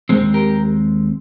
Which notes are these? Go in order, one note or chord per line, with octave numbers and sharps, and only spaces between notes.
D#2 C#3 G#3 C4 G#4 C5
G4 A#4